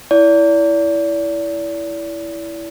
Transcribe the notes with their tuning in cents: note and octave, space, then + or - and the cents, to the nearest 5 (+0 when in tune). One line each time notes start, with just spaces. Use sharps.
E4 +0 D5 -40